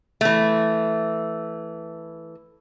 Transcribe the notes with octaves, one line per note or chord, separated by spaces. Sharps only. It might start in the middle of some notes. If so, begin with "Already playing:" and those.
E3 A3